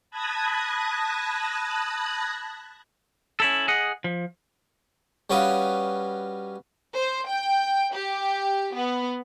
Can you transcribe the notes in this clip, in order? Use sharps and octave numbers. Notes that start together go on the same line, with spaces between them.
A5 B5 D#6 F#6 G#6 A#6
C#4 E4 A4
G#4 D#5 F#5
F3
G3 C#4 F#4 B4 F5 D#6
C5
G5
G4
B3